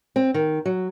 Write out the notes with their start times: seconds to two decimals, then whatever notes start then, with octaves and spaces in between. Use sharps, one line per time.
0.16 C4
0.34 D#3
0.65 F#3